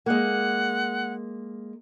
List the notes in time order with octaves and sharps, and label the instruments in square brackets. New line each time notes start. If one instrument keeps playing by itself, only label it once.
[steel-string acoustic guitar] G#3 A#3 [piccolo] F#5